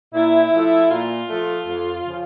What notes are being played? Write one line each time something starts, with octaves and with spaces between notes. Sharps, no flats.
A#2 E4
F3 A3
A#2 F4
F3 A3
F2
C#3 F3